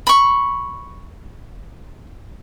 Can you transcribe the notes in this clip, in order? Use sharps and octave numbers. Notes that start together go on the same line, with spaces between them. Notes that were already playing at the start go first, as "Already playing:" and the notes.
B5 C#6